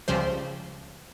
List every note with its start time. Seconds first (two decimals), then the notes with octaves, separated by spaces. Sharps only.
0.08 C#2 C#3 F3 G3 C5